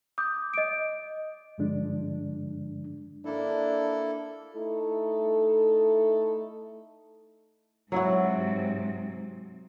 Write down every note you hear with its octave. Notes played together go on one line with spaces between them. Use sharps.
D6 D#6 G6
D#5 D7
G2 D3 F3 G#3 D4
A#3 D4 E4 A4
A3 D#4 E4 A4
G#2 C3 F#3 E4 F#4